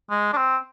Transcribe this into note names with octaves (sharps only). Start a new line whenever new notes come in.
G#3
D4
C4